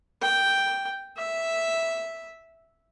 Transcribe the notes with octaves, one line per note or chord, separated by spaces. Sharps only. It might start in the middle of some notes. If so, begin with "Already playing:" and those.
G5
E5